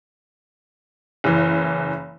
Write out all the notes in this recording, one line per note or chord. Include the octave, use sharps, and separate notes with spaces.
F#1 E3